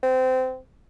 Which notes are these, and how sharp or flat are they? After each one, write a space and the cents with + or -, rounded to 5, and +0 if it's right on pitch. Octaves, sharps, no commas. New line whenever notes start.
C4 -20